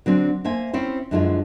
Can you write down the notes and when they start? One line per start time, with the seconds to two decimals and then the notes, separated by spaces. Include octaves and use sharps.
0.06 D3 F#3 C4 C#4
0.44 A#3 C5 E5 G#5
0.73 C4 C#4 E4 C5
1.11 F#2 D3 F3 G#3 E4 F4